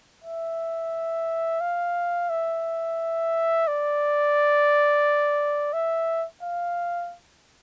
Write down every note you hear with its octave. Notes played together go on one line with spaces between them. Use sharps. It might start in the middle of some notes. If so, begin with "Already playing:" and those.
E5
F5
E5
D5
E5
F5